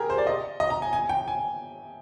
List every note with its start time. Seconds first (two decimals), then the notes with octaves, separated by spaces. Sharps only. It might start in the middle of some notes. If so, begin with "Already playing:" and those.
Already playing: G4 G#4 A#4
0.10 C5
0.18 D5
0.27 D#5
0.60 D#5
0.70 A#5
0.82 G#5
0.93 G#5
1.09 G5
1.28 G#5